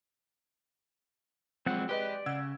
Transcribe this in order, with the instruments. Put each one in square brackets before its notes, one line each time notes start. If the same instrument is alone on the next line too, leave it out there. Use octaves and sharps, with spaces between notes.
[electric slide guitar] F3 F#3 G#3 [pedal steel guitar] C4 F#5
[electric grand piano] G#3 B4 D#5 [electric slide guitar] G4 [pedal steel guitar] D5
[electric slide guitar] C#3 [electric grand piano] F#5 E6 G#6